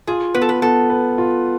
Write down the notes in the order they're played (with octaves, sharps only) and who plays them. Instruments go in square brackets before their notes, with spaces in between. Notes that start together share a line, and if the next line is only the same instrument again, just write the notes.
[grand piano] F4 [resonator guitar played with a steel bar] G#4
[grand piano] B3 [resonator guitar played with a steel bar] B4
[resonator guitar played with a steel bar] A4
B4
[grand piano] B3 [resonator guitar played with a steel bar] A4
[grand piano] B4
F4